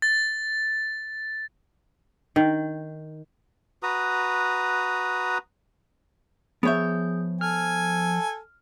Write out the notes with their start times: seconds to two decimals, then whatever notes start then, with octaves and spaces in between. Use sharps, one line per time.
0.02 A6
2.36 D#3
3.83 F#4 B4 A#5 D#6
6.63 F3 B3 G#4 C#5 E5 G6
7.41 A4 G#5 F6